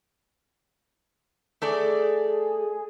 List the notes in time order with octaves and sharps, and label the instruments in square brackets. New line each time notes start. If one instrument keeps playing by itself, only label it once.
[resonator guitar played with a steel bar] A3 A4 D5 [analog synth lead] G#4